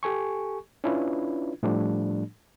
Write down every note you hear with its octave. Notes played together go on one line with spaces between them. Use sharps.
G4 A4 G#5 C#6
C#4 D4 E4 F4 B4
A2 F3 G3 A3 D4